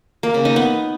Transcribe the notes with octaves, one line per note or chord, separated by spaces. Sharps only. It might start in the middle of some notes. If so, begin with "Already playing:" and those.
A#3
C#3
D#4
B3